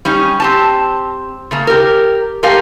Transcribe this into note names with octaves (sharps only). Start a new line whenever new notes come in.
G3 C#4 D#4
C4 G4 A5
C#3 A3 A#3
G4 A#4
G#2 A3 G4 A#4 F5 G#5